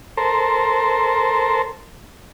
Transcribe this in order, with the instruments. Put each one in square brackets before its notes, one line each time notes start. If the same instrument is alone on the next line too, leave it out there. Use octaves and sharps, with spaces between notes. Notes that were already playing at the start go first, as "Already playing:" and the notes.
[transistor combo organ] A4 A#4 C5